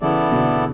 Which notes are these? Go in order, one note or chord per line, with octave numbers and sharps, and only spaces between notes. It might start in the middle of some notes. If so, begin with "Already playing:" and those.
C#3 E3 B3 E4 A4 D5
B2 D3